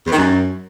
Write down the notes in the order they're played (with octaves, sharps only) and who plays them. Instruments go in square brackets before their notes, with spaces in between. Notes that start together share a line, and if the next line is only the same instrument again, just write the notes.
[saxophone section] E2
D#3
F#2